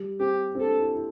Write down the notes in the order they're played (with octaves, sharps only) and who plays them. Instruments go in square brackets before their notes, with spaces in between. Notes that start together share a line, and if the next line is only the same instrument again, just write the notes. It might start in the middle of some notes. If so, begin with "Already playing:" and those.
Already playing: [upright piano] G3
[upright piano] C4 [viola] G4
[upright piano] C4
[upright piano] D4 [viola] A4
[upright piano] E4
E4